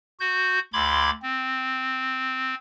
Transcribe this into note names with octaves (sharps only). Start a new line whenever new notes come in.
F#4 G6
D2 B5 C6 D6 G#6
C4